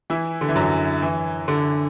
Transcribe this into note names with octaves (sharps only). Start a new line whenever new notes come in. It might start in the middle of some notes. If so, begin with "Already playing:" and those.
E3 E4
D3
E3
F#2 F#3
E3
D3